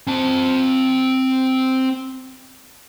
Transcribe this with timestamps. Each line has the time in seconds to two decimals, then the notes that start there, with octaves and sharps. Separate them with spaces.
0.07 C4 A5